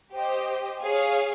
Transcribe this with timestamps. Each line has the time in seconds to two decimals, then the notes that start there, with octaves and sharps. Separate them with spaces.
0.14 G4 C5 D#5 G5
0.81 G#4 C#5 F5 G#5